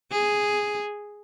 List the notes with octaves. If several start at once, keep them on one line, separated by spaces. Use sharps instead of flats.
G#4